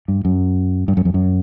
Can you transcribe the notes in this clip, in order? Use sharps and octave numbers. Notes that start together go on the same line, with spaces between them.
G2
F#2
G2
F#2
F2
F#2